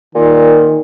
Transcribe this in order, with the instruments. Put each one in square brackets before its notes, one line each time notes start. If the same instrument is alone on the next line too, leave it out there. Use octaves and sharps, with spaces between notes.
[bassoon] A#2 [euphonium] D#3